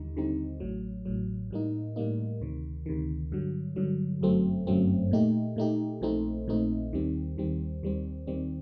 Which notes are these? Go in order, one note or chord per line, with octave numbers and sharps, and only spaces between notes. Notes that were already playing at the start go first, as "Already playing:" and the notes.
Already playing: D#2 D3 G3 D#4
D#2 D3 G3 C4 D#4
A1 A2 F#3
A1 A2 F#3
A2 G3 A#3 D#4
A2 G3 A#3 D#4
D2 C3 D#3
D2 C3 D#3
G2 D3 F#3
G2 D3 F#3
G1 F#2 F#3 A3 C4
G1 F#2 F#3 A3 C4
A#2 A3 D#4 G4
A#2 A3 D#4 G4
A#1 A#2 A3 C4 D#4
A#1 A#2 A3 C4 D#4
D#2 D#3 G3 C4
D#2 D#3 G3 C4
D#2 D#3 G3 C4
D#2 D#3 G3 C4